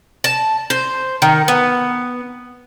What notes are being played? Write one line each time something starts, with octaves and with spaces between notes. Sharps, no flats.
A5
C5
D#3
B3